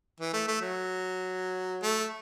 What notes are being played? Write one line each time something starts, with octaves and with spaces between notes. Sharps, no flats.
E3
A3
A3
F#3
A3